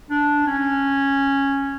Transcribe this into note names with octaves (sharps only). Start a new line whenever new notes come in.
D4
C#4